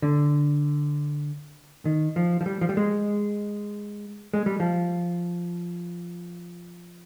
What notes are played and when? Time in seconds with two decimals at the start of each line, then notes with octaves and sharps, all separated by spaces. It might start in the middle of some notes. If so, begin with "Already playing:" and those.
0.02 D3
1.85 D#3
2.16 F3
2.41 F3
2.46 G3
2.61 F3
2.69 G3
2.77 G#3
4.33 G#3
4.46 G3
4.60 F3